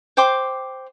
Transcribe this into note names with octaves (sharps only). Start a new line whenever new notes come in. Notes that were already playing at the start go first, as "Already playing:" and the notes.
C5 G5 C6 D6